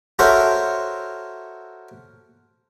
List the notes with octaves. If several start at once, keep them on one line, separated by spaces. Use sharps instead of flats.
F#4 A4 A#4 C5 C#5 E5